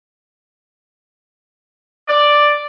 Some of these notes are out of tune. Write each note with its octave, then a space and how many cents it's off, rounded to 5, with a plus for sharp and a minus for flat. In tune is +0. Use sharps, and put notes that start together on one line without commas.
D5 +5